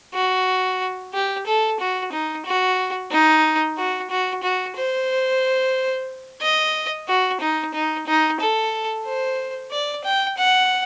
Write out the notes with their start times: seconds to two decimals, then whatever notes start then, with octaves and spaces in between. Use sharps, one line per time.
0.14 F#4
1.14 G4
1.46 A4
1.80 F#4
2.12 D#4
2.46 F#4
3.12 D#4
3.77 F#4
4.10 F#4
4.43 F#4
4.76 C5
6.42 D#5
7.08 F#4
7.40 D#4
7.74 D#4
8.07 D#4
8.40 A4
9.06 C5
9.71 D5
10.04 G5
10.38 F#5